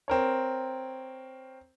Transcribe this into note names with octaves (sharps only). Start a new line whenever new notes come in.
C4 A#4 C#5